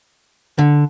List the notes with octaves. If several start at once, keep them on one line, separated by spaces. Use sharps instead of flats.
D3